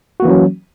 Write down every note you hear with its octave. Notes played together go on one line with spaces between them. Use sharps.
E3 F#3 A#3 C#4 F#4